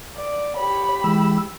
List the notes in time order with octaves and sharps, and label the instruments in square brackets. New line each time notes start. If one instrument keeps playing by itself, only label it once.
[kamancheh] D5
[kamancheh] G4 B5 [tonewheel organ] C#5
[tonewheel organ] E3 G#3 E6